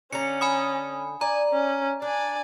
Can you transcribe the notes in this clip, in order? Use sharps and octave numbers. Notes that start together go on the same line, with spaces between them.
D3 C#4 A#5 C#7
G#5 B5 D#6
D5 G#5 A#5
C#4
D4 D5 G#5